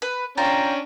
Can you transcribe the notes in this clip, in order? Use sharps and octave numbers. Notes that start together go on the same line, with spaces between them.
B4
C#4 D4 F4 G5 A#5